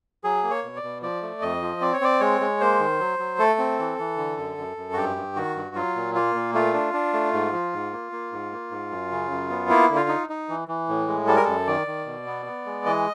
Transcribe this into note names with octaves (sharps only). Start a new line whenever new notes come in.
F#3 G#4
A#3
C#5
B2
D5
B2
F3 D5
A3
F2 D#5
F3
C4 D5
C#5
C4 D5
G#3 C#5
G#3
A#3 C5
D#3
F#3
F#3
A3 A4
C4
E3
E3
D3
F#2
F#2
F#2
F#4
G2 G4
G2
D#3 F#4
G2
F#3 F4
A#2
A#3 F4
A#2
A3 F4
D4
D4
A3
G#2
F3
G#2
A#3
A#3
G#2
A#3
G#2
F#2
C#3
F#2
B3
A#3 E4
D3
F4
D#4
D#4
E3
E3
A2
G#3
G3 A4
A#4
F#2 A4
D#3 D5
D#3
B2
B3
B3
G#3
E3 D#5